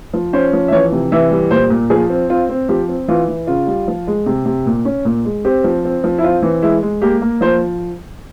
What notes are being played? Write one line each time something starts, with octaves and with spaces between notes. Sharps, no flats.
F3
C#4 C5
F3
E5
E3 C#5
C3
E3 E5
G3
A#2 C5
A#2
F3 G#4
C4
C4 F4
C4
F3 G4
C4
E3 F4
E3
C#3 F4
G3
F3
G#3
C3
C3
A#2
C#4
A#2
G#3
C4 G4
F3
C4
F3
E4
C4 F4
E3
G#3 E4
G#3
A#3 G4
A#3
F3 C5